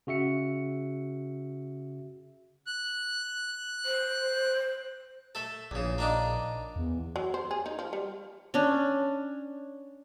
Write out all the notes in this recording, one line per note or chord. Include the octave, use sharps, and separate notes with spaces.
C#3 F#4 E5 C#7
F#6
C5
A3 A4
A#1 E2 C#3
A#3 D4 D#4
E2
F#3
C5
G#4
D#4
F3
G3
C#4 D4